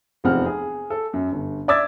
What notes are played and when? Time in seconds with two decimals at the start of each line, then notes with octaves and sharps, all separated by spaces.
0.24 F1 E2 F3 C4 F#5 F6
0.46 G#4
0.90 A4
1.14 F#2
1.32 G1
1.68 D5 E5 D6 E6 G#6 A6